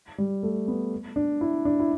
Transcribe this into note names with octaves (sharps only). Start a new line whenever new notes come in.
G3
A3
B3
D4
E4
D4
E4